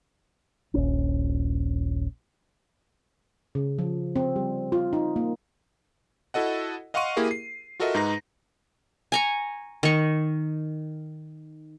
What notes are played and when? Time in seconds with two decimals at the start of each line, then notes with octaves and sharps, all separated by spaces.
0.74 D#1 A#1 C#4
3.55 C#3
3.79 F3
4.16 C4
4.36 G3
4.72 F4
4.93 D#4
5.16 A#3
6.34 E4 F#4 A4 D#5 F#5
6.94 D#5 F5 F#5 C6 C#6 D#7
7.17 A#3 E4 G4 G#4 A#4
7.31 C7
7.80 F4 F#4 A4 A#4 D#5 E5
7.94 G#2 D#4 B4 A#5 A#6
9.12 G#5 A#5 C#6
9.83 D#3 C#6